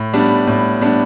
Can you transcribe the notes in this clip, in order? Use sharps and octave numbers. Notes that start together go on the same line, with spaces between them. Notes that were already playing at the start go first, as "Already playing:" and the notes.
Already playing: A2
G3 B3 D4
A2
G3 B3 D4